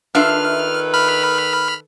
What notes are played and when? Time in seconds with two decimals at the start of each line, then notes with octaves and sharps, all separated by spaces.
0.15 D#3 D4 F4 A4 B4 E5 F6
0.93 B5 F6